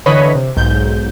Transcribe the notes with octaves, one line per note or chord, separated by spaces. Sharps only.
D3 E3 B4 C#5 D#5 B5
C3
B1 G#2 G6